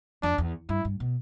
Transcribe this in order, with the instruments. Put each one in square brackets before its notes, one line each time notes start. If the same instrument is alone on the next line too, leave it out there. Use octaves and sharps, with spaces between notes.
[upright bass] F2 [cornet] D4
[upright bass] E2
[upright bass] G2 [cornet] E4
[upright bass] G2
B2